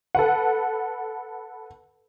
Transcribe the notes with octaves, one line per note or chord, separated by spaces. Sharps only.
A4 B4 F#5